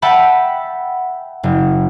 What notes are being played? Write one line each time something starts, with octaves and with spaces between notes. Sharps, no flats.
E5 F#5 G5 A5 B5
F#1